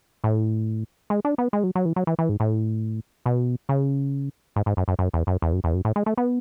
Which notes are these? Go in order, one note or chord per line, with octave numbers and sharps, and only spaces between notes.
A2
G#3
D4
B3
G#3
F#3
F#3
E3
F#3
E3
E3
G#2
A2
B2
C#3
G#2
G#2
F#2
F#2
F#2
E2
F#2
E2
F#2
E2
F#2
A2
G#3
A3
B3